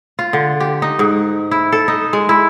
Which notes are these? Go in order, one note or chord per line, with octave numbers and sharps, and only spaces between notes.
F4
D3
G4
D#4
G#2
E4
A4
D#4
G#3
E4